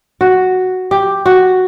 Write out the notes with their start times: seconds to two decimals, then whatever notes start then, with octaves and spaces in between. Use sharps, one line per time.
0.21 F#4
0.91 G4
1.26 F#4